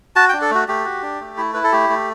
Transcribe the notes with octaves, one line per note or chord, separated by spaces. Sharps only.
F#4 A5
G5
D4
A4
A3 F#4
A3 G4
F#4
D4
A3
E4
E4 B4
A4
A3 G4
A3